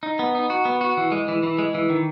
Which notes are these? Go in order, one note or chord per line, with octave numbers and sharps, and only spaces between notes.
D#4
B3
D#4
F#4
B3
F#4
E3
G#3
E3
E3
G#3
E3
D#3